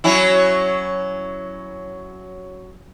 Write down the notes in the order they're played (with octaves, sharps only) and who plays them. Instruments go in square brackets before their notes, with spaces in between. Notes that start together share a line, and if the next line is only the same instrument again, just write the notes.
[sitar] F#3 C#4 E4